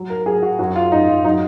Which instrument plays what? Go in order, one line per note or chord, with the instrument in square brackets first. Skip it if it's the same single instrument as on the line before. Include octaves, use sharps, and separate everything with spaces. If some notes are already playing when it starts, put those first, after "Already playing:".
Already playing: [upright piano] F#3
A#4
F#3 G#4
F#4
F#2 F#4
F4
F#2 D#4
F4
F#3 D#4